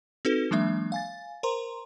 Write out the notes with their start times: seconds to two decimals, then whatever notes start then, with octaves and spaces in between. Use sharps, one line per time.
0.25 C4 D#4 F#4 A4 B4
0.51 E3 F#3 G#3 A#3 D4 E5
0.92 F5 G#5 A6
1.43 A#4 C5 A#5 C6